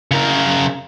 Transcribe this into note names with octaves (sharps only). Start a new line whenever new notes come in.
C#3 A#4